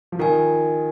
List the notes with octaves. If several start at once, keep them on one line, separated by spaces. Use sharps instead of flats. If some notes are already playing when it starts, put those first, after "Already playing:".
F3
D#3 F4 A#4 D#5 G#5